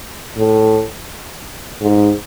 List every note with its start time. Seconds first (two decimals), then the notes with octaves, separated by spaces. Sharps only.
0.37 A2
1.81 G#2